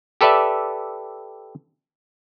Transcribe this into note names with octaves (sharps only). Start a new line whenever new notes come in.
G4 A4 B4 D5 E5